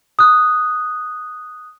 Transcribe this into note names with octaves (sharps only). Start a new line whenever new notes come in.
D#6 F#6